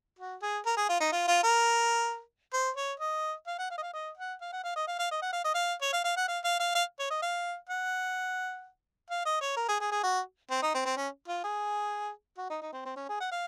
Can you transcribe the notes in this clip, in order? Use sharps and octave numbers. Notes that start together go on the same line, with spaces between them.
F#4
G#4
A#4
G#4
F4
D#4
F4
F4
A#4
C5
C#5
D#5
F5
F#5
F5
D#5
F5
D#5
F#5
F5
F#5
F5
D#5
F5
F5
D#5
F#5
F5
D#5
F5
C#5
F5
F5
F#5
F5
F5
F5
F5
C#5
D#5
F5
F#5
F5
D#5
C#5
A#4
G#4
G#4
G#4
F#4
C4
D#4
C4
C4
C#4
F4
G#4
F#4
D#4
D#4
C4
C4
C#4
G#4
F#5
F5